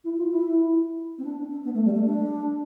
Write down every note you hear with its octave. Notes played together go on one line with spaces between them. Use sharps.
E4
F4
E4
C4
D4
D4
B3
A3
G3
A3
D4